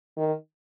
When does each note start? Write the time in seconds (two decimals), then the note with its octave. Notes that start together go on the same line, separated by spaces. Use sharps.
0.17 D#3